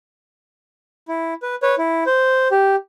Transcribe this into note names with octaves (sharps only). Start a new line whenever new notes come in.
E4
B4
B4 C#5
E4
C5
G4